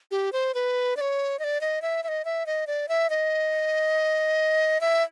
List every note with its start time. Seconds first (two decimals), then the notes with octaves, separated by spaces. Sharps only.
0.11 G4
0.33 C5
0.54 B4
0.97 D5
1.01 C#5
1.39 D#5
1.44 D5
1.61 D#5
1.82 E5
2.04 E5
2.08 D#5
2.25 E5
2.46 D#5
2.67 D5
2.89 E5
3.10 D#5
4.81 E5